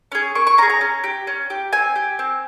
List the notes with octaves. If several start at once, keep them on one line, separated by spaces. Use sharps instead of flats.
C#4 G#4
A#3 C#6
C#6
C#4 G#4 A#5
A#5
C#4
G4
C#4
G4
C4 G#5
G4
C4